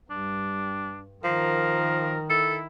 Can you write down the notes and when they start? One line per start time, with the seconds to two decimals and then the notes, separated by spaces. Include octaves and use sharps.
0.10 G2 G3 D4
1.24 D#3 F3 A#4
2.30 E4 A4